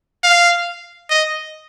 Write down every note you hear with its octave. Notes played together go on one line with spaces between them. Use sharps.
F5
D#5